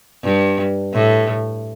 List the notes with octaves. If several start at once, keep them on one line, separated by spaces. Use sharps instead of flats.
G2
A2